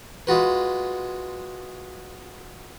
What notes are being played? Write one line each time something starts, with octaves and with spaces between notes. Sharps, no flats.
G#3 F4 F#4 B4